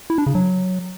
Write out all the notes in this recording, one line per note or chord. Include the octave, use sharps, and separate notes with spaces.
E4
D4
C#3
F#3